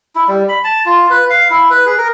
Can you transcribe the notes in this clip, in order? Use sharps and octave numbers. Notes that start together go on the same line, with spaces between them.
E4
G3
B5
A5
F4
B4
F5
E4
B4
G#4
A#4